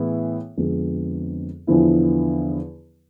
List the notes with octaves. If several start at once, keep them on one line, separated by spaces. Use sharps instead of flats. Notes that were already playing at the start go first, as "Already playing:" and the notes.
Already playing: A2 E3 B3 E4 G#4
F2 D3 G#3 B3
E2 D3 F3 B3 E4